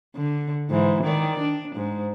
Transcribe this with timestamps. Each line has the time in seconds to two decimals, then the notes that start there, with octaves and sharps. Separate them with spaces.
0.16 D3
0.70 G#2 E3
1.04 D#3 D5
1.40 D4
1.75 G#2